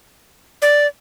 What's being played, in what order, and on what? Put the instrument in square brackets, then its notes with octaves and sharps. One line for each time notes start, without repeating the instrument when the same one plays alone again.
[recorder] D5